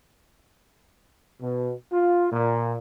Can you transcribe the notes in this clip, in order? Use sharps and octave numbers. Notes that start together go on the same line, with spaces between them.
B2
F4
A#2